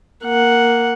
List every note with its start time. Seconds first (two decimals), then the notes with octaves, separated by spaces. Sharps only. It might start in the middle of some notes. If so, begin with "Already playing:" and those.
0.25 A#3 F#5